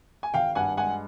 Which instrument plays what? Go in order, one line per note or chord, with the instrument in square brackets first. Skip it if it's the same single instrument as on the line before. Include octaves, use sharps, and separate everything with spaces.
[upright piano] G#5
G#1 F5 G5
G2 F#5 G#5
G#3 F#5 G#5